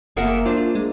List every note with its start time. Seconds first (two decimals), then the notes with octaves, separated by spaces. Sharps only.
0.17 F#1 A#3 G#4 A#4 E5 F#5 G#5
0.45 D4 F4 C5
0.57 F4
0.75 G#3